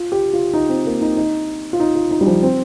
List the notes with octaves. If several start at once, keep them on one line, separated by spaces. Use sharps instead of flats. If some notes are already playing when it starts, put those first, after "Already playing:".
Already playing: F4
G4
F4
D#4
C4
A#3
D#4
D#4
F4
D#4
F4
D#4
G3
F3
C4